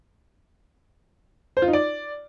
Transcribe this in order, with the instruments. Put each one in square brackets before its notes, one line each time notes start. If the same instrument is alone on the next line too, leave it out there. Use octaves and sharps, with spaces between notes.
[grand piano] C5
F4
D#4
D5